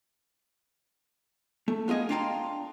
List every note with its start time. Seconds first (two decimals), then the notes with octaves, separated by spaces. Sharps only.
1.68 A3
1.88 B3 F4 G#4 D#5 G#5
2.09 D4 F4 F5 G5 A#5 C6